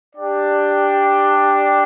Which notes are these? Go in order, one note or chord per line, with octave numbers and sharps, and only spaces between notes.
D4 G4 D5 G5